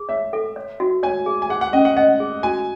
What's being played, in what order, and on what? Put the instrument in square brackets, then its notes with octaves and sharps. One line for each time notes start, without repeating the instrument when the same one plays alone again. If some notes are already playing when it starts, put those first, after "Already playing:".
Already playing: [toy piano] G#4
[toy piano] C#5 [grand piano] E5
[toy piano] A4
C#5
F#4
[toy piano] C#5 [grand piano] G#5
[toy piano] G#4
[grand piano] G#5
[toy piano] G#4 [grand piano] F#5
[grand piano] F#5
[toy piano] C#4 [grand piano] D#5
[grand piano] F#5
[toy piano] D#5 [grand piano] F#5
[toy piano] G#4
[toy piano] F#4 [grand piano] G#5